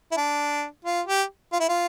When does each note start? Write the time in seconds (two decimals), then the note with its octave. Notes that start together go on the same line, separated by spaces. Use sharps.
0.11 E4
0.17 D4
0.85 F4
1.07 G4
1.52 F4
1.60 E4
1.68 F4